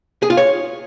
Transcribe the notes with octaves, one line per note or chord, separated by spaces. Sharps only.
G#4
F4
C#5